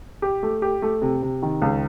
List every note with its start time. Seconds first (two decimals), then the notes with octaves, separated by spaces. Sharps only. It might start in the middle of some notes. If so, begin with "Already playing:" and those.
0.22 G4
0.43 A3
0.62 G4
0.82 A3
1.02 C3
1.23 C3
1.42 D#3
1.62 C#2